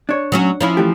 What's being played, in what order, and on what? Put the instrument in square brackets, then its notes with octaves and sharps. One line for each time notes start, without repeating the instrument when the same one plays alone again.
[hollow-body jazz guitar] D4 C#5
[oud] F#3 C#4 F#4
F3 C#4 E4
[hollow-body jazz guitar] E3 A3 G4